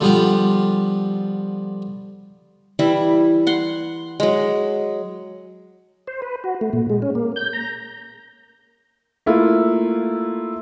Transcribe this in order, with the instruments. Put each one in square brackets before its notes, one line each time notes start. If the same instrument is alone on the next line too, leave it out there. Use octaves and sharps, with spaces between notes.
[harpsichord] D3 F3 G3 B3 F4 G4
[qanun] E3 G3 E4
F#5 C6
F#3 G#3
[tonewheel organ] C5
B4
F#4
A3
A#2
G#3
C#4
A#3
G6
A#5
[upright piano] A3 A#3 E4 F4